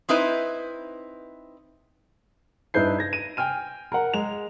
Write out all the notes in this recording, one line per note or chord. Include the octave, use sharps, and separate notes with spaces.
C4 D#4 E4 B4 C5
G2 D#4 E4 B4 G6 C7
G#6 A#6
D#7
G5 G#5 F6 D#7
A#4 F#5
G#3 G#4 F7